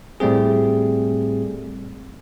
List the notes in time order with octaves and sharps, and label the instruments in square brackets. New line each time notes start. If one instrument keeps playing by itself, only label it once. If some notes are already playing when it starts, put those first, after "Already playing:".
[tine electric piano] A2 G3 A3 C4 G#4